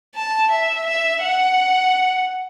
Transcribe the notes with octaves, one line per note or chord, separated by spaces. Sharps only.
A5
E5
E5
F#5